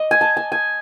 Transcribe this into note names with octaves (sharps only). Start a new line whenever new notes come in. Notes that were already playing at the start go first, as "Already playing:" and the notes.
Already playing: D#5
G#5
A5
G#5
G#5